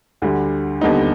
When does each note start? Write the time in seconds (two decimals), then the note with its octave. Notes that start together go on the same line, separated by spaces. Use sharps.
0.22 D2 D3 G3
0.81 D#2 D3 G3 B3 D#4